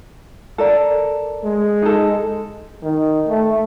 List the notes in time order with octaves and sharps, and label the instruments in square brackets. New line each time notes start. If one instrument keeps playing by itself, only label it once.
[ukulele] A4 A#4 D5
[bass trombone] G#3
[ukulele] D#4 A4
[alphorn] D#3
A3